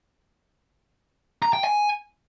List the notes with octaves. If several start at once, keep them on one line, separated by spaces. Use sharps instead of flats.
A#5
G5
G#5